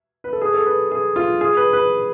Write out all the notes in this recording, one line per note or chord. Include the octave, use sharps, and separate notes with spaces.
B4
A4
G#4
A4
B4
G#4
F4
G#4
B4
B4